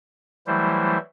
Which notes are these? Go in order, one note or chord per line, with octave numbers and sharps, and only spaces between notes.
E3 F#3 G3 A3 E4 C5